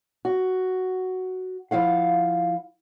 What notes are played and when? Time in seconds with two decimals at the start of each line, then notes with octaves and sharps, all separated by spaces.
0.25 F#4
1.71 F3 E4 F5 F#5